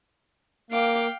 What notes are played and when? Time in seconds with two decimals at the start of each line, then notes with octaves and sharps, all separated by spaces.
0.71 A#3 F5 G5 D6